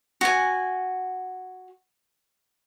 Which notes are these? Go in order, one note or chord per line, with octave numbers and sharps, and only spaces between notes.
F#4 G#5